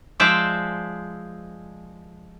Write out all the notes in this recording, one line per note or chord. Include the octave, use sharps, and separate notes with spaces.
F3 G#3 C5 D5 E5